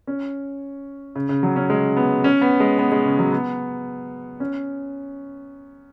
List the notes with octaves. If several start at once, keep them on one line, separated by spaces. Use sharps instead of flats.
C#4
C#3
C#3
F#3
C#4
G#3
B3
C#4
B3
G#3
B3
G#3
C#3
F#3
B3
C#4